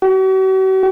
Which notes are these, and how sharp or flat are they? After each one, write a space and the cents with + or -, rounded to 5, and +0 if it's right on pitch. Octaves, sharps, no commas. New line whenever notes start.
F#4 +45